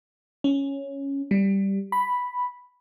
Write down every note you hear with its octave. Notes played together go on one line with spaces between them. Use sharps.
C#4
G3
B5